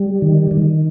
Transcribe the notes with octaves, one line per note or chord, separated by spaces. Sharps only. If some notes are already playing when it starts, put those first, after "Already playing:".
Already playing: G3
D#3
D#3